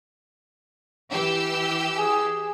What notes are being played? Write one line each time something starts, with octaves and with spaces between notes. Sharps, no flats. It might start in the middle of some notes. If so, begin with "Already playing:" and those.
E3 G4 E6
G#4